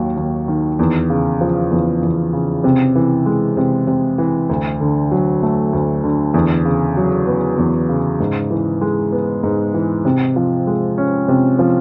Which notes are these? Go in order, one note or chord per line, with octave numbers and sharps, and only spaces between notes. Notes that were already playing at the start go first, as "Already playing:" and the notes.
Already playing: D#2 D#3 F#3
D#2
D#3
E2
C#3
F3
E2
E2
C#3
C3
E3
G#3
C3
C3
E3
D2
D3
F#3
A3
D2
D3
E2
C#3
F#3
B3
E2
C#3
G#2
E3
G#3
B3
G#2
E3
C3
F3
G#3
C#4
C3
F3